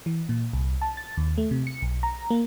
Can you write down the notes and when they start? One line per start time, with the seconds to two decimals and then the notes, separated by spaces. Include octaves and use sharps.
0.06 E3
0.29 A#2
0.53 C2
0.81 A5
0.97 A6
1.17 D#2
1.38 A3
1.51 C3
1.67 C#7
1.82 B1
2.03 A#5
2.30 A#3